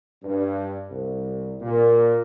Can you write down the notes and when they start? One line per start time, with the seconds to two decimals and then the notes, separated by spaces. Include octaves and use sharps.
0.23 G2
0.89 C2
1.61 A#2